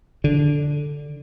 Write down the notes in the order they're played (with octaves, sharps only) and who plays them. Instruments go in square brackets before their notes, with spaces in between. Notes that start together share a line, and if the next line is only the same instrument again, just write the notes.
[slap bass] D3